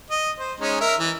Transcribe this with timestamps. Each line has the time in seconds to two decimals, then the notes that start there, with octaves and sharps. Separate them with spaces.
0.10 D#5
0.39 C5
0.60 G#3 C#4 D#4
0.81 A#4 E5
0.99 E3